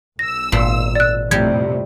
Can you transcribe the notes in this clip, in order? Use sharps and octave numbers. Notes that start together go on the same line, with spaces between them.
B1 E6 A#6
G#1 A#2
D5 F#6
F2 A2 C3 G3 G#6